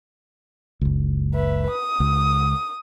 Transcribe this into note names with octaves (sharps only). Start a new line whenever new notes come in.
F#1 C#2
B4 E5
D#6
C#2